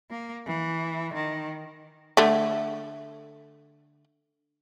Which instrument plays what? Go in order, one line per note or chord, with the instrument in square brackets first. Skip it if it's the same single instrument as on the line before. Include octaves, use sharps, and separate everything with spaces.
[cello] A#3
E3
D#3
[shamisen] D3 A3